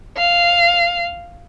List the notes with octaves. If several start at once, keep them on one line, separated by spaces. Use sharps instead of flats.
F5